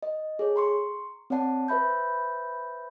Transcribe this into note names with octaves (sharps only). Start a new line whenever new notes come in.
D#5
G#4 A4 C#5
A#5 C6 C#6
C4 C#5 D5 F#5 A5
B4 C5 E5 B5 G6